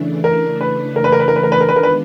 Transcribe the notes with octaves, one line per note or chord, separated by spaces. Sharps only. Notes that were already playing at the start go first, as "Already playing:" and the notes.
Already playing: C#3 E3 A3 D4
A#4
B4
A#4
B4
A#4
B4
A#4
B4
A#4
B4
A#4
D#3 G#3 B3 D4 F4 B4
A#4
B4